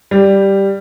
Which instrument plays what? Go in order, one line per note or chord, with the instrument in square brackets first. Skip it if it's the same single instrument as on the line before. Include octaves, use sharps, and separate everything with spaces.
[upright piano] G3